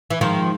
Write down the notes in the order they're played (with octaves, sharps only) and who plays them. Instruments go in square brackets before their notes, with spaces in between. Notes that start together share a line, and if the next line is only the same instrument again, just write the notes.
[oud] E3
[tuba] G#2 [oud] D#3 F3